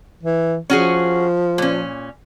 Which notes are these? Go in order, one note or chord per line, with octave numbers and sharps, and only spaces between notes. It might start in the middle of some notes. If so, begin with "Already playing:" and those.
E3
F3 C#4 F#4 G#4
A#2 C#4